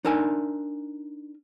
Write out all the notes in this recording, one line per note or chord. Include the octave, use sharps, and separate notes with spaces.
D4 D#4 A#4 E5 G#5